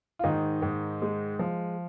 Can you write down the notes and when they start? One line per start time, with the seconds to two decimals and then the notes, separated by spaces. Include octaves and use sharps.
0.19 F4
0.24 G#2 D#3 D#4
0.62 G#2
1.02 G#3
1.39 F3